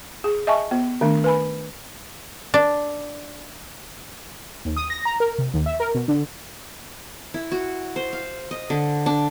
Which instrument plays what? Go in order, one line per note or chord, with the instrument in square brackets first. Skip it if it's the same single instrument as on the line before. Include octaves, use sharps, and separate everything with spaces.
[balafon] G#4
D#5 E5 G#5 A5 C#6
B3
D#3 A3 D4
B4 G#5 B5
[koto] D4
[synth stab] D#2
D#6
A#6
A#5
A#4
C3
D#2
E5
A#4
B2
D3
[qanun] E4
F#4
C5
F5
D#5
D3
D4